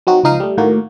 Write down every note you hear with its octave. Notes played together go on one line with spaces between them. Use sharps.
F#3 C4 D#4 F#4
C#2 F3 D#4 F5 D#6
G3 A3
A2 D#3 A#3 F#4